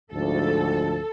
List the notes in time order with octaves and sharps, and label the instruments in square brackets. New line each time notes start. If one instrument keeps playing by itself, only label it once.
[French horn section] D2 G#2 F3 [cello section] A4